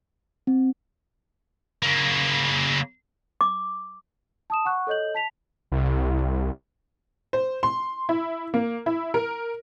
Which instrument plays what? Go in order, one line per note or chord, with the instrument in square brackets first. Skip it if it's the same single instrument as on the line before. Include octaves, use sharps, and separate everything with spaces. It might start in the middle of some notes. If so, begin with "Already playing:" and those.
[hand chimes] C4
[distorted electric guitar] C#3 A#3
[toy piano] D6
[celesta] A5 D#6 E7
F#5 C#6 F#6
A4 C#5 D#5 G6 F#7
A5 B6 F7
[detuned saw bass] C2
[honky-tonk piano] C5
C6
E4
A#3
E4
A#4